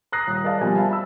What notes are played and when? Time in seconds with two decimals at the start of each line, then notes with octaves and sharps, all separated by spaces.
0.12 A#5 D#6 F#6 A#6 C7
0.27 D#1 D#6
0.44 G#4 A#4 D5 D#5 F5 A5
0.61 B2 F3 G3 A#3 G#5
0.76 C5 E5 F5 A5 B5
0.90 A5 B5 E6